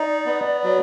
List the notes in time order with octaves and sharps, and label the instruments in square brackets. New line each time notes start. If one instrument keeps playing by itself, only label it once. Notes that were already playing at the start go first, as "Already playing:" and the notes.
Already playing: [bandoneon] D#4 [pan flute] D5
[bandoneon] B3
F#3